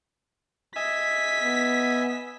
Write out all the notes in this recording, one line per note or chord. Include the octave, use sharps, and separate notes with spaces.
D#5 E5 G#5 B6
B3